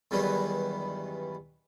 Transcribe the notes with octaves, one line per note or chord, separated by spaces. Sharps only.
E2 G2 D#3 E3 F#3 B3